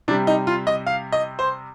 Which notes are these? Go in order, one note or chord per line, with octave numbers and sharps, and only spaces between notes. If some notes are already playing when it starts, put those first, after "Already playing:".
C3 G3 D4
D#4
F4
D#5
F5
D#5
C5